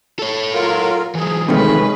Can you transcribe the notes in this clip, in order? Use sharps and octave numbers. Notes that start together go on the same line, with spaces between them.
A4 C#5
F#3 F4 A#4
E3 F#3 G#4
C3 D#3 G#3 A3 C#4 B4